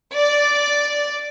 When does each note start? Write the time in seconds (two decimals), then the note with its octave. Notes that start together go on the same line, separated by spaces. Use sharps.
0.15 D5